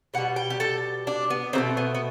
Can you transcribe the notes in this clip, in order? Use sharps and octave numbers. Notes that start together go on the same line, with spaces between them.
B2 G3 F#5
G5
G4
A4
D4
B3
B2 F#3 A3 C4
B3
B3